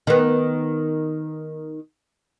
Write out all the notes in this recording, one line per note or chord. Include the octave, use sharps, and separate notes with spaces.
D#3 B3